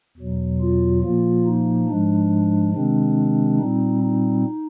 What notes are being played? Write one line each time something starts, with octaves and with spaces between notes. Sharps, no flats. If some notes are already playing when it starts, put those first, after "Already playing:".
E2 B2 F#3
F4
A#2 F3 A#3 F4
D#4
G#2 F3 G#3 D4
C3 D#3 G#3 C4 D4
A#2 G3 C4 D#4
D#4